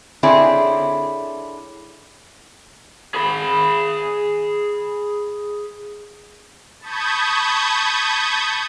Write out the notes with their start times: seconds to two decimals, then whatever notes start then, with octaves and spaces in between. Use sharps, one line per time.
0.23 D3 C4 D4 E4 G#4 C#5
3.15 G#4 B5
6.80 A5 B5 C#6 D#6 G6 G#6